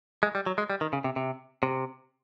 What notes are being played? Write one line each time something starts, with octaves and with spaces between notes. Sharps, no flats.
G#3
G3
F#3
G#3
G3
D#3
C#3
C3
C3
C3